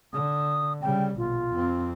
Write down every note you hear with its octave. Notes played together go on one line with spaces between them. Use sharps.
D3 D#6
C#3 G3 G5
A#1 B2 F4
F2 C4